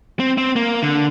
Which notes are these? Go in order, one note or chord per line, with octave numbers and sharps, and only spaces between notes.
C4
C4
A#3
D3